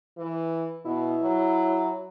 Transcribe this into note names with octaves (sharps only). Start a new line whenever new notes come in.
E3
B2 E4
F#3